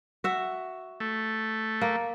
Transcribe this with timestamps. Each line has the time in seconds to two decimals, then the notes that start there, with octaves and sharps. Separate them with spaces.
0.24 F#4 E5
1.00 A3
1.81 A#3